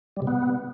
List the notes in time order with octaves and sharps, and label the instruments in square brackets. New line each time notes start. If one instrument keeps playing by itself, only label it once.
[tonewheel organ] G3
C3
B3